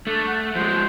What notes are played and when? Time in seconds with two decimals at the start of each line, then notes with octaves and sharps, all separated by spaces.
0.07 A3 D4
0.28 F#5
0.56 F3 G#3 C5